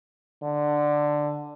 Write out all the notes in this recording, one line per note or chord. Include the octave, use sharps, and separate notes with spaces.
D3